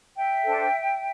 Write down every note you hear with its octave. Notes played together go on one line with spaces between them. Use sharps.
E5 G5
D4 A4 C5